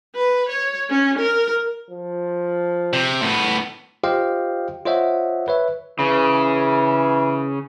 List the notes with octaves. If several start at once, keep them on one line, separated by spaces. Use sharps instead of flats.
B4
C#5
C#4
A#4
F3
C3
A2 B3
F4 G4 C5 D#5 F5 G5
F4 C5 C#5 D#5 E5 F#5
B4 C#5 E5
C#3 E3